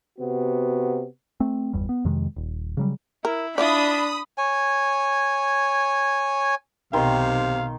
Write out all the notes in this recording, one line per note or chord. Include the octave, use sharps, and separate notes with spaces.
C3 B3 F#4
A3 C4
G1 E2 G3
B3
F2 C3 D#3 G#3
D#1
C#3 F#3 G3
E4 A#4
D4 E4 F4 D5 B5 D#6
C#5 G#5
B1 C3 D#3 F5 C6